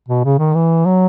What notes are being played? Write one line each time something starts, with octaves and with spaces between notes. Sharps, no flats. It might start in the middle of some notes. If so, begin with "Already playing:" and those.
B2
C#3
D#3
E3
F#3